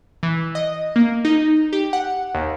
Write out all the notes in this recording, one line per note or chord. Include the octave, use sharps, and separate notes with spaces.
E3
D#5
A#3
D#4
G4
F#5
D#2